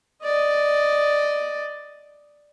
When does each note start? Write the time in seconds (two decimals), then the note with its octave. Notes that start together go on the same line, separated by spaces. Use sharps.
0.23 D5 D#5